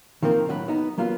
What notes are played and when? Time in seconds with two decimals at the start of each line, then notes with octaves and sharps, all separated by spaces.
0.22 D#3 F3 A#3 C4 A#4
0.48 B1 A2 F#3 F#5 B5
0.68 B3 D#4
0.98 F#3 A#3 B3 F4